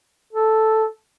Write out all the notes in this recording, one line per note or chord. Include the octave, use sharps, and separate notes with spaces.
A4